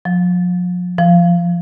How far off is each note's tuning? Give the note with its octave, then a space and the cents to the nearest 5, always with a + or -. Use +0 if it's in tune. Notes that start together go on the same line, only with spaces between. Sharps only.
F3 +40
F3 -15